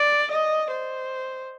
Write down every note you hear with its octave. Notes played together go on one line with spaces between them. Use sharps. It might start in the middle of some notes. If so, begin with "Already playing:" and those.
Already playing: D5
D#5
C5